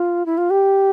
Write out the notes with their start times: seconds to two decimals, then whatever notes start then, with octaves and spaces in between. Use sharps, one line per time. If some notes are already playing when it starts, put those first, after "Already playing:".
Already playing: F4
0.26 E4
0.37 F4
0.50 G4